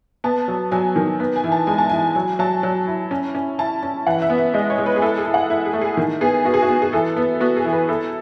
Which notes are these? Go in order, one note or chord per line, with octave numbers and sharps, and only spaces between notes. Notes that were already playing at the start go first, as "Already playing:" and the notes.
B3 A5
F#3
F#3 G#5
D#3
B3
G#5
E3
A5
G#3 G#5
A5
E3 G#5
F#3 G#5
F#3 A5
F#3
E4
C#4
C#4
E4 A5
C#4
E3 F#5
E5
B3
E5
G#3 D#5
C#5
G#3
B4
G#4
E4 A4
G#4
E4
F#5
E4 E5
G#4
A3
G#4
D#3
B3 G#4
B3 F#4
G#4
F#4
B3
G#4
E3 A4
B3
B3 F#4
G#4
E3
B4
E4 A4